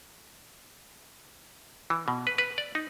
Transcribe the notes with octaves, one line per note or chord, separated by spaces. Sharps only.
E3
B2
B4
B4
D5
D#4